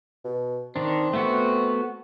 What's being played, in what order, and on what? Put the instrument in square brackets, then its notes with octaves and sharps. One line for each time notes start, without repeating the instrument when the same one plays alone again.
[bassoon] B2
[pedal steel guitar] D#3 D4 [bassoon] C4
[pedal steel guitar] A3 B3 F#4